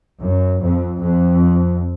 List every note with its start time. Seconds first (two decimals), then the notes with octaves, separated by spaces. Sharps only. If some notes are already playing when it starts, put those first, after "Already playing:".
0.19 F#2
0.60 F2
1.02 F2